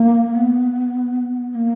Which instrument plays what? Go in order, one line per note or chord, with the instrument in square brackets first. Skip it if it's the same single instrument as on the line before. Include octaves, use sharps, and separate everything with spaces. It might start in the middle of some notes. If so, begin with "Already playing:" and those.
Already playing: [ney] A#3
B3
B3
A#3